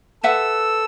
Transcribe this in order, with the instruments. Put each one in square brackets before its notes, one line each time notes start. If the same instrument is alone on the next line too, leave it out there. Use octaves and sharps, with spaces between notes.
[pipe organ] A4 E6 [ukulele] B4 E5 F#5